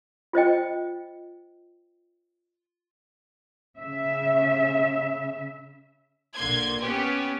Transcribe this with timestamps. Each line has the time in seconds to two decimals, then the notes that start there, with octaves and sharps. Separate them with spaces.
0.33 F4 C5 D#5 G5
3.79 C#3 E5
6.36 A#1 D3 A#3 C6 G#6
6.80 B3 C#4 G4 B4